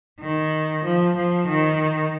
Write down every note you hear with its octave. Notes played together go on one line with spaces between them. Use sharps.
D#3
F3
F3
D#3